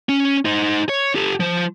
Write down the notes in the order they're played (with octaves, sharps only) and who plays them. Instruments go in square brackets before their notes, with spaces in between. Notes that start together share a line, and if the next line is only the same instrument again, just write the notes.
[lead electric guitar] C#4
D#4 C5
C#5
G4 A4
F3 C5